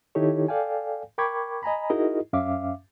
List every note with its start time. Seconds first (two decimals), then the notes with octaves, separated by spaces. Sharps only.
0.15 D#3 D#4 E4 G4 A4 C#5
0.48 A4 D5 F5 G5 G#5
1.18 A#4 G5 B5 C#6 D6 G#6
1.63 D#5 G#5 A#5 B5
1.90 D#4 E4 F#4 G#4 A#4 D#5
2.33 F#2 C#4 E5 F5 D6